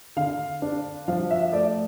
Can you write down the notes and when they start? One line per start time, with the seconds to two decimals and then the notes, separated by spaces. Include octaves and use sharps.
0.16 D3 F5
0.62 D4
1.08 F3 F5
1.31 E5
1.52 A3 D5